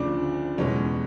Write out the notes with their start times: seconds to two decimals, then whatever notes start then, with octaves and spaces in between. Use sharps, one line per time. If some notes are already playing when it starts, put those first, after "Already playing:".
Already playing: D2 C#3 F3 D4
0.58 E2 B2 G#3 C#4